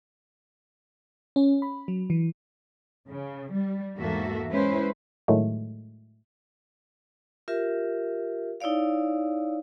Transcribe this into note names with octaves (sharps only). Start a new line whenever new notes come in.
C#4
B5
F#3
E3
C#3
G3
E2 G#2 A#3 F#4 A4 E5
G#3 C#4 E4 B4 C5
A2 D3 D#3 F#3 G#3 A3
F4 G4 A#4 E5
D#4 E4 C#5 D5 F5